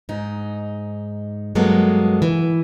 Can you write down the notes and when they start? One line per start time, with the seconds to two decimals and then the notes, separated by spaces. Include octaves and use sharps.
0.09 G#2 D#4
1.55 G2 F#3 G#3 A#3 B3 A4
2.22 E3